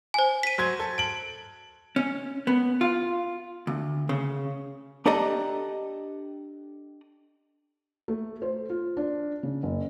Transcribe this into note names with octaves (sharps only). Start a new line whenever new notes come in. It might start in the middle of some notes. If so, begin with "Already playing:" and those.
C5 G#5
B6 D#7
F#3 C5 G#6
A4
D7 F#7
C#4
B3
F4
D2
C#3
D4 G4 A4 D5 D#5 A#5
A3
C5
F4
D4
C#3
F#1